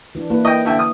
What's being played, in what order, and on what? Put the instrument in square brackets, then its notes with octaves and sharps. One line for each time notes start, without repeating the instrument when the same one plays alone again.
[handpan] E3 D4
A#3 E4 B4
[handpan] E4 [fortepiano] D#5 G5
[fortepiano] D3 E5 G5
D#6